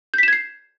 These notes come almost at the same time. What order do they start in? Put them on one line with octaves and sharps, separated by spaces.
G6 B6 E7 G#6 C7